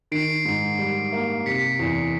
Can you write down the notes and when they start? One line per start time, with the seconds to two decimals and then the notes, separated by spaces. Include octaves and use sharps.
0.11 D#3 C7 D7
0.45 G#2
0.79 G3
1.13 A#3
1.46 C3 B6 C#7
1.79 E2